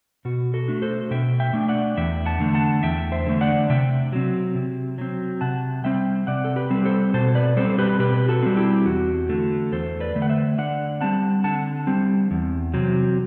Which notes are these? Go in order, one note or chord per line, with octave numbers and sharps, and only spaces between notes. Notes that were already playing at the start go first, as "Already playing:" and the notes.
B2 F#4
F#4 A4
A3 D4
A4 C5
B2 E5 G5
E5 G5
A3 D4
D5 F#5
E2 E5 G5
F#5 A5
D3 A3
F#5 A5
E2 E5 G5
C5 E5
D3 A3
D5 F#5
C3 E5 G5
F#3 C4
C3
F#3 C4
C3 F#5 A5
G3 C4 E5 G5
C3 D5 F#5
A4
G4 B4
G3 C4
A4 C5
B2 A4 C5
B4 D5
G3 C4 A4 C5
C5
G4 B4
B2 G4 B4
F#4 A4
G3 C4
E4 G4
E2 F#4
D3 A3
E2 A4 C5
B4 D5
D3 A3
F#5
C5 E5
D3 D5 F#5
G3 C4 F#5 A5
D3 F#5 A5
G3 C4
E2
C3 F#3